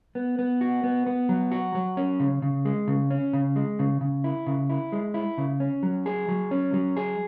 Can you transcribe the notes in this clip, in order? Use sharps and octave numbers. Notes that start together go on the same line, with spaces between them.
B3
B3
F#4
B3
B3
F#3
F#4
F#3
C#4
C#3
C#3
G#3
C#3
C#4
C#3
G#3
C#3
C#3
E4
C#3
E4
G#3
E4
C#3
C#4
F#3
G#4
F#3
C#4
F#3
G#4